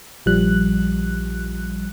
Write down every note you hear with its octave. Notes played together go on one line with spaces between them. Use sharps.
A#1 F3 G3 F#6